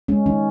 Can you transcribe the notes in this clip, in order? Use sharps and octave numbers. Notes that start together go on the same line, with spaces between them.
G#3 C#4
D#3 C#4